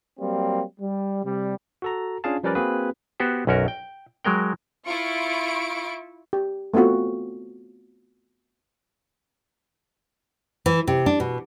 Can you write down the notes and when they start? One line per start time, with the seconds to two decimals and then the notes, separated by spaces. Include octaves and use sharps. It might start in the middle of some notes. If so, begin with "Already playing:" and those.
0.19 F#3 G3 A#3 C4
0.80 G3
1.24 C3 G3
1.82 F#4 A4 A#5
2.24 C#4 D4 F4 G#4 F5 A5
2.43 F3 G3 C#4 A#4 B4 D5
2.55 A#3 C4 F#4 G#4 B4
3.20 B3 F#4 G4 C5
3.47 B1 F#2 C#4 F#4 A#4
3.68 G5
4.25 F#3 G#3 A#4 G5
4.86 E4 F4 C#6 D7
6.33 G4
6.74 A3 B3 C4 F4 F#4
10.66 E3
10.87 C3
11.06 D4
11.20 B2